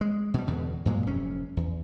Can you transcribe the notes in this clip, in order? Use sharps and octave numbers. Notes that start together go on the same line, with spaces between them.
G#3
B2 G3
E2 G2 B2 D3
G2 A#2 F#3 G#3
F1 C3 C#4
E2